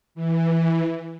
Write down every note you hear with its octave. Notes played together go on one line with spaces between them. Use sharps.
E3